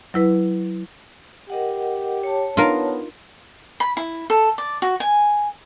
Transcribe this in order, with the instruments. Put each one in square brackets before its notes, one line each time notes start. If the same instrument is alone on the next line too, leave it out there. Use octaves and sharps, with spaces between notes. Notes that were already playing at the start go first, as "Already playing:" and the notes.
[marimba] F#3 E4 B4
[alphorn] G4 [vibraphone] A#4 D#5 F#5
[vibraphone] C#5 A5
[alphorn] B3 [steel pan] D4 D#4 [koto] F4 A#4
[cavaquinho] B5
E4
A4
D5
F#4
G#5